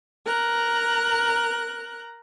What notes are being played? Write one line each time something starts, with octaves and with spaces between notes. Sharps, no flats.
A#4 A#5 F#6